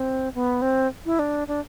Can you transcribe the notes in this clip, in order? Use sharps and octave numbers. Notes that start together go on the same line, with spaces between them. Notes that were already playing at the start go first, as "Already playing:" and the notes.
Already playing: C4
B3
C4
E4
D4
D4